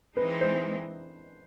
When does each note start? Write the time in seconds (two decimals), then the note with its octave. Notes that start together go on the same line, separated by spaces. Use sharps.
0.17 E3 G#3 C4 D#4 B4
0.41 C5